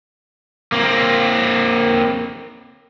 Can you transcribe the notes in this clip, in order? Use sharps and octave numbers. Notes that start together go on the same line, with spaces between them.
A#3 C4